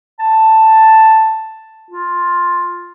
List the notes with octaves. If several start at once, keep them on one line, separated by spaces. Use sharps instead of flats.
A5
F4